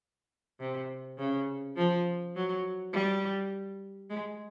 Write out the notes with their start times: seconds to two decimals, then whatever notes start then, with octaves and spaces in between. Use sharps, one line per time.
0.60 C3
1.18 C#3
1.76 F3
2.35 F#3
2.93 G3
4.10 G#3